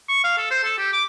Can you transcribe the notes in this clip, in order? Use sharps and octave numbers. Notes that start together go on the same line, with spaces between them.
C#6
F5
A4
C5
A4
G4
D6